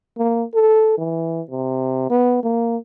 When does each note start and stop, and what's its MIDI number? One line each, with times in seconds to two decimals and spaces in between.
0.18 0.43 58
0.54 0.96 69
0.98 1.41 52
1.51 2.08 48
2.10 2.40 59
2.43 2.77 58